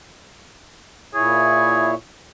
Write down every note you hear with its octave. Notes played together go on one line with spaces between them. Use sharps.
A#2 E4 G#4 C#5